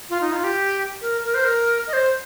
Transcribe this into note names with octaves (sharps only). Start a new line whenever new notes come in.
F4
D#4
F4
G4
A#4
A#4
C5
A#4
D#5
C5